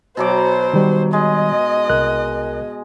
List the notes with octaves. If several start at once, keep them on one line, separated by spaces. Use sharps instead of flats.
B2 F#3 C5 D6
D#3 G3
G#3 D#5
C2 A#4 F#6